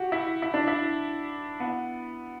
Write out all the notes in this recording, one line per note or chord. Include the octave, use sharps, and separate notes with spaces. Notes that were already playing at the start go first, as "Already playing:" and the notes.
Already playing: F#4 G4
E4
E4
D4
E4
B3